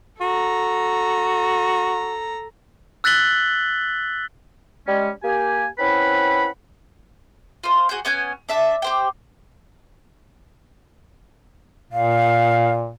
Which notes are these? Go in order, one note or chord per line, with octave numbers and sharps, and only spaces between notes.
F#4 A4 A#5
E6 F#6 A6 B6 F#7 G7
G3 G#3 C#4
A#3 G4 G#5
C4 C#4 E4 B4 F#5 B5
F4 C5
F#4 G#4 C5 G6
B3 C#4 G#5 G6
D4 E5 A5
G4 C5 G5
A#2 F5